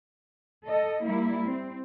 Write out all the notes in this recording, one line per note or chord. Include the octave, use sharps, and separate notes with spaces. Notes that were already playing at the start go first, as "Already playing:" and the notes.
A4 D#5
G3 A#3 E4
C4